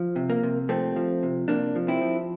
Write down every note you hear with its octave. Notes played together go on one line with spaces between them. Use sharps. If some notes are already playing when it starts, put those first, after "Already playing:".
Already playing: F3
C3
A#3
C3
F3 A3 C4
F3
C3
C3 A#3 D4
F3
C4 E4
F3